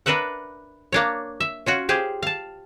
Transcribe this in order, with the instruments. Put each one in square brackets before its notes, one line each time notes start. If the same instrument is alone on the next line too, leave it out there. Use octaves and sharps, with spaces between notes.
[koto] D4 A#4 B4 E5 F#5
A#3 D4 C#5
E5
C#4 F4 F#4
G4 G#4 C5 F5
F5 A5